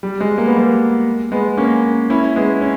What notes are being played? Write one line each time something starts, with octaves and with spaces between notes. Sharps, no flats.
G3
G#3
A#3
B3
G3 A#3
G#3 B3
A#3 C#4
C#4 E4
G#3 B3
C#4